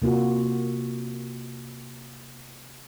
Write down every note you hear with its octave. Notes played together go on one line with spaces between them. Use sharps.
C3 A#3 F4 F#4